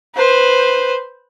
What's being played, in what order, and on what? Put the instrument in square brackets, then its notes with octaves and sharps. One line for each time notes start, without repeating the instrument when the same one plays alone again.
[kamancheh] B4 C5